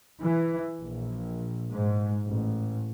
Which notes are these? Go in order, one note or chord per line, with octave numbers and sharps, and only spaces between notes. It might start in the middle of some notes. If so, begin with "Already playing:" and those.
E3
A#1
G#2
A1